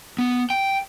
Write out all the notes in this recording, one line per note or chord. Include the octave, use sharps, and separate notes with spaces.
B3
G5